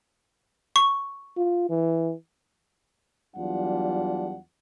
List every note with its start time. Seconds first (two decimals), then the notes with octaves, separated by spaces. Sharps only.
0.76 C#6
1.37 F4
1.69 E3
3.37 E2 F#3 G3 D4 F4 F#5